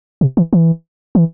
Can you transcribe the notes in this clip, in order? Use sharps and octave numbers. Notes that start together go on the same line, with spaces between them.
C3
E3
E3
E3